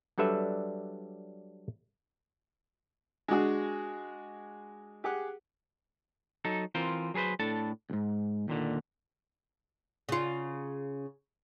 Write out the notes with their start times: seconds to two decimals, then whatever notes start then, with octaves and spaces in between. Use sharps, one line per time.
0.18 F#3 G3 D4 A4 B4 E5
3.28 G#3 D4 F#4 G#4
5.04 G4 G#4 F#5
6.45 F#3 D#4 A4
6.75 E3 C4 F4 A#4 C5
7.14 F#3 G#4 A4 B4 C5
7.39 A2 D4 A4 A5
7.90 C#2 G#2
8.48 D#2 A#2 D3
10.09 C#3 F4